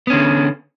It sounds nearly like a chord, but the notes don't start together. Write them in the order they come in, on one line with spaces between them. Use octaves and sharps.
B3 C#4 D3